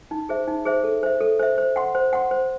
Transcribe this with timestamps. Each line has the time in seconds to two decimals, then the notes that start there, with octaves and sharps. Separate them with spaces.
0.11 D#4
0.29 G#4 C5 E5
0.48 D#4
0.65 G#4 C5 E5
0.84 A4
1.03 C5 E5
1.21 A4
1.39 C5 E5
1.58 C5
1.76 F#5 C6
1.95 C5
2.13 F#5 C6
2.31 C5